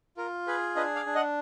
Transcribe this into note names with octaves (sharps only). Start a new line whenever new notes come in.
F4 A#4
G#4 B4
D4 B4 D#5
D5 F5
D4
D#5 F#5